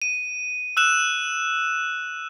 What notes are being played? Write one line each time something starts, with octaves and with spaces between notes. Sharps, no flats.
D#7
E6 F#6 E7